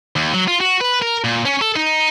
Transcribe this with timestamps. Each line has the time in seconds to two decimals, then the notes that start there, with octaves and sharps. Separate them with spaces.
0.16 D#2
0.34 F#3
0.48 F4
0.61 F#4
0.81 B4
1.02 A#4
1.24 A#2
1.46 C#4
1.61 A4
1.76 D#4